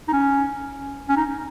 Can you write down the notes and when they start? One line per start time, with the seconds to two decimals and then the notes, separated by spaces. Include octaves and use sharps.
0.08 D#4
0.13 C#4
1.09 C#4
1.17 D#4